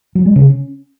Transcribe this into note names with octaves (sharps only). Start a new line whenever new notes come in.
F#3
G#3
C#3
C#4